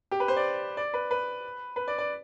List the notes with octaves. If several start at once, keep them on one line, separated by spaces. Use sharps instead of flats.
G4
B4
C5
D5
D5
B4
B4
B4
D5
D5